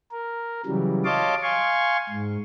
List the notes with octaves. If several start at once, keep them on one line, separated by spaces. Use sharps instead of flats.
A#4
C#3 E3 F#3 G3
C#5 D#5 F5 A5 C6 D6
F5 G#5 C6 C#6
G#2